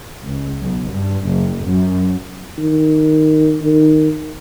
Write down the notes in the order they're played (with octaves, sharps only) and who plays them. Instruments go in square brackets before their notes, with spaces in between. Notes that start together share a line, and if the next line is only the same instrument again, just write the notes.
[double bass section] C#2
B1
G2
F#1
F#2
[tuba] D#3
D#3